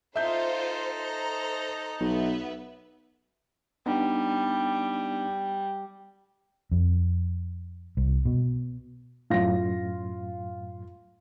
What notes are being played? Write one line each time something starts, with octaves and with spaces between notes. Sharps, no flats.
D#4 F4 A4 C5 E5 G6
C5 A#5
B1 B3 B4 E5
G3 B3 D4 D#4
F2
C2
B2
F#2 A2 F4 A#6